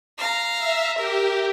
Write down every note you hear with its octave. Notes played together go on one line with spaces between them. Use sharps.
F5 A#5
E5
G4 A#4